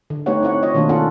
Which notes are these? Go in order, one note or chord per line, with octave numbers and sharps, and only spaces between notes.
D3
A3 B3 D#4 G4 C#5 F#5
C4 E4 C#5 F#5
F4 C#5 D#5
B2 D#3 A3 A#3 D4 F4
C#4 F4 A4 F#5